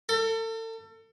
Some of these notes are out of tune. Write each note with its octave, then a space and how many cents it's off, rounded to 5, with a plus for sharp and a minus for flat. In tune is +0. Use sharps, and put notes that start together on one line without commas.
A4 +35